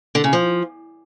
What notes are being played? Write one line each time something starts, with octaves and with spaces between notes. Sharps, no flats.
D3
C#3
F3